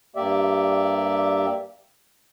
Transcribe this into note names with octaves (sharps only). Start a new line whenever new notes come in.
G2 A#3 G4 D5 E5